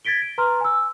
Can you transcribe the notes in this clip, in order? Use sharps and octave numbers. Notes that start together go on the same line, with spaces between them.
G#6 A6 B6 D7 G7
D7
B4 A#5 C6 F6
G#5 E6